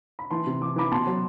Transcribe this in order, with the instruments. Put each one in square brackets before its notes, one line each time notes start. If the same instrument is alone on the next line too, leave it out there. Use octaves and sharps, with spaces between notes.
[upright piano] B5
E3 A5 C6
C3
E3 D6
E3 B5 D6
B2 A5 C6
F#3